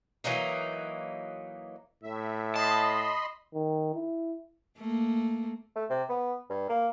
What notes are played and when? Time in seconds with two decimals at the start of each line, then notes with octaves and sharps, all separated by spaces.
0.24 E3 F#3 A#3 D#4
2.03 A2 E5
2.56 D#5 A5 B5 C6
3.54 D#3
3.95 E4
4.78 A3 A#3
5.76 A3
5.90 C3
6.09 B3
6.50 G2
6.69 A#3